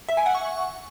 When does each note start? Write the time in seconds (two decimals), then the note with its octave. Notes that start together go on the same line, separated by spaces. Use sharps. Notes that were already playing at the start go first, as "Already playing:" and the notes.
0.09 E5
0.17 G#5
0.26 F#5
0.35 C#6